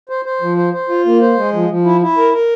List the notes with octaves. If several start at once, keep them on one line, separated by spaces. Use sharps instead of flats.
C5
C5
F3
C5
C5
F4
A#3
C5
G#3
F3
F3
E4
E4
A#4
A#4